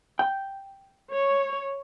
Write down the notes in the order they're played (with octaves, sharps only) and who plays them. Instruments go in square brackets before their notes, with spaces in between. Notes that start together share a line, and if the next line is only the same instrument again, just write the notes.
[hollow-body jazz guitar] G5
[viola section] C#5